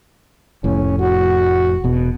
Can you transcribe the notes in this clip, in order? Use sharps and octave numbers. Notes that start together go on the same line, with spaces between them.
F1 A2 C#4
F#4
E1 B2